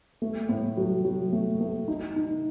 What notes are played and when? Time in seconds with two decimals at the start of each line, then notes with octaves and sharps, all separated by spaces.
0.22 A3
0.49 A2
0.77 F#3
1.05 F#3
1.33 A3
1.61 A3
1.88 D#4
2.16 D#4